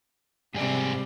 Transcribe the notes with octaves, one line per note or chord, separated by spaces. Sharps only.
G#2 C3 G3 G#4 D5